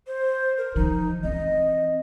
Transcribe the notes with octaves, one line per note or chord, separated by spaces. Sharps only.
C5
A#4
D#3 F3 D#4
E3 C4 D#5